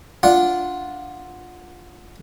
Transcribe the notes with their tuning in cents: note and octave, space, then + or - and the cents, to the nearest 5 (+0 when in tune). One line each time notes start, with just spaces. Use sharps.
D4 +0 F4 +0 F#5 -15